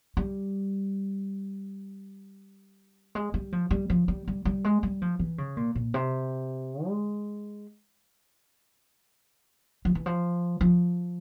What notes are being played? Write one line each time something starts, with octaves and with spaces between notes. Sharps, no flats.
G3
G#3
G3
F3
G3
F3
G3
G3
G3
G#3
G3
F3
E3
C#3
A#2
A#2
C3
G#3
F3
E3
F3
F3